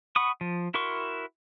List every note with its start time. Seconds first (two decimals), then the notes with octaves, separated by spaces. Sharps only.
0.16 F#5 B5 C#6 D#6
0.41 F3
0.74 E4 F#4 A#4 C6 C#6